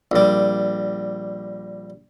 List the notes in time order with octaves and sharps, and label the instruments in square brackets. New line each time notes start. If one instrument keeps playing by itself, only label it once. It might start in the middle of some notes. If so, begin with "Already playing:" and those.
[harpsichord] A#1 G3